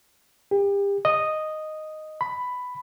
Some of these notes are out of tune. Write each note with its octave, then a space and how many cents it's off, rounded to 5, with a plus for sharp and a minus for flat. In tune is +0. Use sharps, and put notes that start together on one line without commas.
G4 +35
D#5 -5
B5 +10